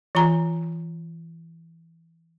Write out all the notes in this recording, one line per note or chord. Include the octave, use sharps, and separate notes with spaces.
E3 F4 G#5 A#5